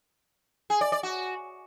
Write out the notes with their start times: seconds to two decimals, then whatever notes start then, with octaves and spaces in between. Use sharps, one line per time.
0.70 G#4
0.81 D5
0.92 D5
1.03 F#4